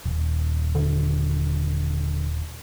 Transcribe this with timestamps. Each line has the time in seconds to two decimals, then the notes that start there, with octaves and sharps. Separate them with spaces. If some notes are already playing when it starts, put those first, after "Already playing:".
0.05 D#1
0.75 D3